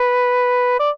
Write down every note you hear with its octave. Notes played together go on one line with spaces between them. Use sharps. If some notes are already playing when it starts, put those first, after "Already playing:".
Already playing: B4
D5